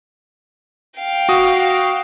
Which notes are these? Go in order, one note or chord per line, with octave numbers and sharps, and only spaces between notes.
F5 G5
F#4 D#6